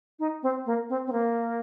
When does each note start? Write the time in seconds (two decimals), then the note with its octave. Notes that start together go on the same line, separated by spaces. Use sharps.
0.19 D#4
0.43 C4
0.66 A#3
0.89 C4
1.07 C4
1.12 A#3